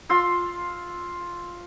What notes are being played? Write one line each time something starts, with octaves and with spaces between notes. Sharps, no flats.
F4 C6 E6